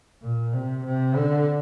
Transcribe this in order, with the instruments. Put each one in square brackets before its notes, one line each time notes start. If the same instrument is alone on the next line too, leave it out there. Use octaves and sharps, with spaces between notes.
[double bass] A#2
C3
C3
D3